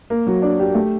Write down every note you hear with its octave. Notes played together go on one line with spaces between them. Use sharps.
A#3
F#3
D4
G4
A3